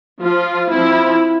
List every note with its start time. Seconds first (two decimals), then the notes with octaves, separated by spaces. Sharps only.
0.21 F3 F4
0.72 F3 C4 E4